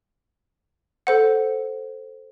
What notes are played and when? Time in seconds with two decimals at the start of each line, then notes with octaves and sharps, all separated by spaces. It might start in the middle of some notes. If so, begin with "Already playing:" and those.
1.07 A4 C5 F#5